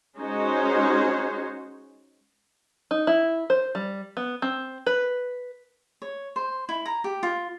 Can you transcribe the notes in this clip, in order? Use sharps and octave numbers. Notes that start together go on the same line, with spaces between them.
G#3 C#4 D#4 F#4 C5 C#5
D#4
E4
C5
G3
B3
C4
B4
C#5
C5
E4
A#5
G4
F4